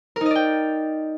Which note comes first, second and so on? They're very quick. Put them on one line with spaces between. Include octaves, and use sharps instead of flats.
A#4 D#4 D#5 D5 G5